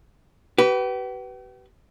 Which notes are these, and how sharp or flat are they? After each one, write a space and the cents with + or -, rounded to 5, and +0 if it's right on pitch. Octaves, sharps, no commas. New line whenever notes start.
G4 -45 B4 +0